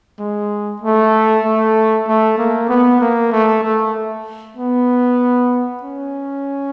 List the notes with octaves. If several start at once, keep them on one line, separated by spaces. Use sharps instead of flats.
G#3
A3
A3
A3
A#3
B3
A#3
A3
A3
B3
C#4